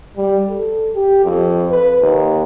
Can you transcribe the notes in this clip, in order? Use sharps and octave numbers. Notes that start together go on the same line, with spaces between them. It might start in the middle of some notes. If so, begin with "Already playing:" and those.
G3
A4
G4
F2
B4
D#2